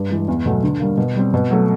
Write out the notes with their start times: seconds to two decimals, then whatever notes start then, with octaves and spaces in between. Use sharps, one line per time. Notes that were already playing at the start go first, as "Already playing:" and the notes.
Already playing: G2
0.10 E3 G#3
0.28 E2
0.46 B2 F#3 A3
0.64 D3
0.80 G3 A#3
0.98 B2
1.16 G3 C4
1.34 B2
1.50 F#3 A3